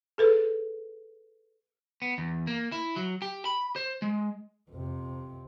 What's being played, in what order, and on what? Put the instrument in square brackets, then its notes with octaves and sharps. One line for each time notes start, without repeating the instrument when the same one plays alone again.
[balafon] G#4 A4 B4
[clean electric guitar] B3
E2
A#3
E4
F#3
G4
B5
C5
G#3
[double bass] F2 C3